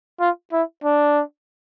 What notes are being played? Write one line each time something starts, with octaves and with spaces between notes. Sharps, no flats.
F4
E4
D4